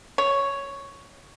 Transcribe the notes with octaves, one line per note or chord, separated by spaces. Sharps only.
C#5